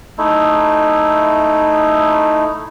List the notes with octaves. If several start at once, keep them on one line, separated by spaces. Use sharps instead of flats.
A3 D#4 E4